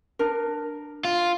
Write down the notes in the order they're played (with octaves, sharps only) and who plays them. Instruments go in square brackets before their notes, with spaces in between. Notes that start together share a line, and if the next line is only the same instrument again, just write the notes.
[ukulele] D4 A#4
[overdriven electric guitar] F4